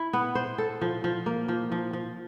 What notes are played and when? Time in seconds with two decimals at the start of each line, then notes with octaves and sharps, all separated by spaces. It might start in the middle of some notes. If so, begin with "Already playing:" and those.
Already playing: E4
0.13 B3
0.35 C5
0.58 A4
0.81 F3
1.04 F3
1.26 A#3
1.48 F3
1.72 F3
1.93 F3